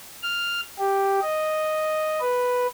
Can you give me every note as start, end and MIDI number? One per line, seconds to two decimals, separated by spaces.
0.23 0.61 89
0.79 1.19 67
1.22 2.20 75
2.21 2.67 71